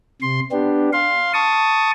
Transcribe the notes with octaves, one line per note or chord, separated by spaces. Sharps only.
C3 C6
B3 D4 G4
F5 C6
A5 C#6 D#6